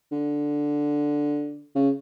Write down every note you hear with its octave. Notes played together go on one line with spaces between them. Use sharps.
D3
C#3